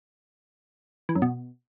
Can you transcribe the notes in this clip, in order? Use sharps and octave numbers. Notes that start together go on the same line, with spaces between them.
E3
F#2
B2